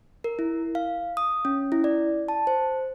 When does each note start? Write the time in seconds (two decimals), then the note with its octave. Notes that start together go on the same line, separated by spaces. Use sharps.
0.24 A#4
0.39 E4
0.75 F5
1.17 D#6
1.45 C#4
1.72 E4
1.84 D5
2.28 A5
2.47 C5